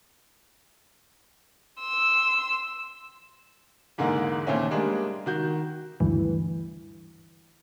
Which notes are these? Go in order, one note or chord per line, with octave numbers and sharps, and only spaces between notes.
C6 E6
E2 G#2 D3 G#3 A#3
D#2 A#2 A3 C4 C#4
G3 G#3 A#3 D4
D#3 F#4 G6
D2 G2 E3